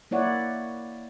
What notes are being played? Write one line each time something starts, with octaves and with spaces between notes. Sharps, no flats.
A#3 E4 C#5 D5 F#5